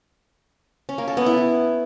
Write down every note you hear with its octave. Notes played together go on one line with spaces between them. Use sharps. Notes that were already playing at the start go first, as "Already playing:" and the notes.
C#4
A#3
A4
B3
E4